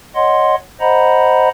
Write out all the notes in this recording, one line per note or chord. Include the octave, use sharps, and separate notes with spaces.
C#5 D#5 F#5 C6
C5 D#5 F#5 A#5 B5